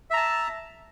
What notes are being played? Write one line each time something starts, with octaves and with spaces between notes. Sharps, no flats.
E5 A5 A#5